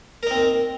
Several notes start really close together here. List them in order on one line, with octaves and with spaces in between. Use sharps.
A#4 D#4 C4